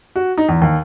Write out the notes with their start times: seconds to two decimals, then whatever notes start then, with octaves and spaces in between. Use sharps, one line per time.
0.16 F#4
0.38 D#4
0.49 E2
0.62 D#2